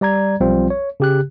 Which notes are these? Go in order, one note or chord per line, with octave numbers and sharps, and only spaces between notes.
G3 D5 A#5 G#6
B1 F3 G3 C4 F4
C#5
C#3 G4 F#6